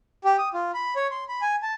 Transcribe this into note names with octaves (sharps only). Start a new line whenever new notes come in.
G4
D#6
F4
B5
C#5
C6
B5
G#5
A5